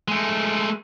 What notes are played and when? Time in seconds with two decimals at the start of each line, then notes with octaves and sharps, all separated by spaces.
0.08 G#3 A3